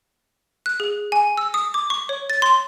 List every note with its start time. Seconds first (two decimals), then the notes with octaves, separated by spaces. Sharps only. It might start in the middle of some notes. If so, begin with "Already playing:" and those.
0.66 F#6
0.80 G#4
1.12 G#5
1.37 E6
1.54 D#6
1.74 D6
1.90 C#6
2.09 C#5
2.30 A6
2.42 C6